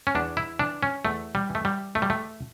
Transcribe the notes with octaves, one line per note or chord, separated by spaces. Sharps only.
C#4
E2 D4
E4
E3 D4
C#4
E2 A3
G3
E3
A3
G3
E2 A3
G3
A3